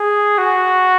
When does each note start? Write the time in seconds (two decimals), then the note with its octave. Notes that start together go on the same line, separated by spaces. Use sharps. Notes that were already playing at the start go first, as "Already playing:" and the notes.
Already playing: G#4
0.38 F#4